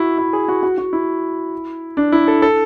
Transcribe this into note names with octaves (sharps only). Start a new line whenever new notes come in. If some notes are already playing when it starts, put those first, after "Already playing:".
Already playing: E4 F#4
E4
G#4
F#4
F#4
F#4
E4
D4
E4
A4
A4